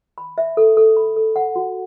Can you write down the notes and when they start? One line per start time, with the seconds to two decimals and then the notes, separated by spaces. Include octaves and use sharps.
0.18 B5
0.38 E5
0.57 A4
0.77 A4
0.97 B5
1.16 A4
1.36 F#5
1.56 F#4